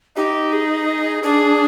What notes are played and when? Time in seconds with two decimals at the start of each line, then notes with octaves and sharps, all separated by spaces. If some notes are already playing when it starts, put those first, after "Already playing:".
0.16 D#4 G4
0.53 G#4
1.23 D4 G#4